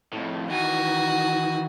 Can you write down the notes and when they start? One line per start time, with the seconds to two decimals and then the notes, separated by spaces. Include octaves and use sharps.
0.13 F2 A2
0.49 D#3 E3 F#4 G#5